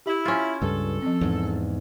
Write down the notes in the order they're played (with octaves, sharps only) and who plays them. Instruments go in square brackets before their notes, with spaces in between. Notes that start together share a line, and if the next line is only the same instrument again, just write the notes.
[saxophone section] E4 [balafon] G4
[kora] C#4 F4
[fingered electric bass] C#2 G2 [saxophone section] A4
[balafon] F3 C4
[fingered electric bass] E2 G#2